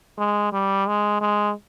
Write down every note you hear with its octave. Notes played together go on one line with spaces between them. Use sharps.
G#3
G3
G#3
G#3